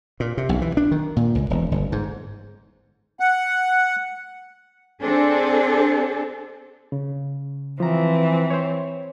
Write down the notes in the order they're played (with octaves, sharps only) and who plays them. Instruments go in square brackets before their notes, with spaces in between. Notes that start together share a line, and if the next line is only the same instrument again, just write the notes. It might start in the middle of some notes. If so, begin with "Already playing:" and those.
[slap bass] A#2
C3
B1
E3
D4
D#3
A#2
C#2
E1
G1
G#2
[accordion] F#5
[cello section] C4 D4 G#4 A4
[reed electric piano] C#3
[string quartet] E3 C4 [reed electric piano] F3 A#5
[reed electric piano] C5 C#5